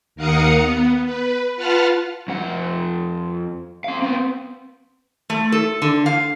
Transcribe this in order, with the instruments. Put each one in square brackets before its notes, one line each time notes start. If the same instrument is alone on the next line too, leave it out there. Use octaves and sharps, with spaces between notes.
[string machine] D#2 A#4 F5 F#5 D#6 C#7
B3
B4
F4 B4 F#5 A5 F6
[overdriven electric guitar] F2 F#5
C4 F5
B3 C4
[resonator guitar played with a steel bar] A3
A4
D3
F5